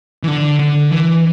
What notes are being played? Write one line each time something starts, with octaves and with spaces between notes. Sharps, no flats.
E3
D3
D3
E3